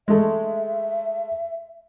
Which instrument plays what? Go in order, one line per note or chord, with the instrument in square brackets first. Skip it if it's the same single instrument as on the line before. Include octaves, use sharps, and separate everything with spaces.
[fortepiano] G#3 A3 [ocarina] E5